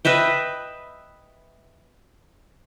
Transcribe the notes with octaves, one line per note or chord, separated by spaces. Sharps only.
B4 D#5 E5 G5